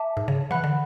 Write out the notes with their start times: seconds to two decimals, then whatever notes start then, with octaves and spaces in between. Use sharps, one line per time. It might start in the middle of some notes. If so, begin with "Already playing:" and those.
Already playing: E5 A5 D6
0.17 G#2
0.28 C#3
0.51 E3 F#5 B5 F#6
0.64 D3